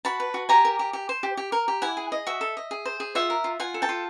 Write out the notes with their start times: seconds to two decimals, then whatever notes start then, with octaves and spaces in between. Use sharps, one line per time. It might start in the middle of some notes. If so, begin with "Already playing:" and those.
0.05 F#4 A5 B5
0.20 B4
0.34 F#4
0.49 G4 G#5 A#5
0.65 A#4
0.79 G4
0.93 G4
1.09 C5
1.23 G4
1.37 G4
1.52 A#4
1.68 G4
1.82 E4 F#5 G#5
1.97 G#4
2.12 D#5
2.27 F#4 E5
2.41 A4
2.57 D#5
2.71 G#4
2.85 C5
3.00 G#4
3.15 F4 E5 F#5
3.30 A#4
3.44 F4
3.60 F4 F#5 G#5
3.74 A4
3.82 G5 A5
3.89 F4